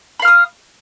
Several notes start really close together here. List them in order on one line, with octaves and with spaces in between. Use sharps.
B5 F5 F6 D#6